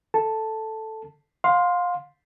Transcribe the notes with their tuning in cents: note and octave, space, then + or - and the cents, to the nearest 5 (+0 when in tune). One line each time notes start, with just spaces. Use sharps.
A4 +0 A5 +0
F5 +25 C6 +0